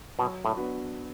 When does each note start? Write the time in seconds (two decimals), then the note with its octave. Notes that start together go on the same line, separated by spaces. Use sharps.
0.19 B2 F#3
0.45 A2
0.57 B3 D4 F#4 B4